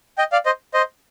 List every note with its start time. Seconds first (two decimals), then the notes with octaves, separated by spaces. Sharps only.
0.18 D#5 G5
0.32 D5 F5
0.46 C5 D#5
0.74 C5 D#5